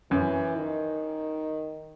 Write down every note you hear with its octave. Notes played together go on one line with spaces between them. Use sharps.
F#2 E3
D#3